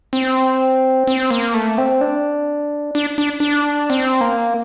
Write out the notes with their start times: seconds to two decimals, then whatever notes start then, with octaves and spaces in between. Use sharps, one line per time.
0.13 C4
1.07 C4
1.31 A#3
1.54 A3
1.78 C4
2.01 D4
2.95 D4
3.18 D4
3.40 D4
3.90 C4
4.21 A#3